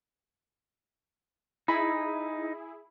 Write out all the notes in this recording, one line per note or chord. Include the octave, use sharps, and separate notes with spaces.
D#4 E4 G#4 B5